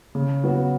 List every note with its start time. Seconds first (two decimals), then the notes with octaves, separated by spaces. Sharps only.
0.15 C#3
0.44 F#3 B3 F#4